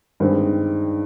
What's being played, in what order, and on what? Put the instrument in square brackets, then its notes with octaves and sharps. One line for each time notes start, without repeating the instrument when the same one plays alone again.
[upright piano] G2 D#3 G#3 C4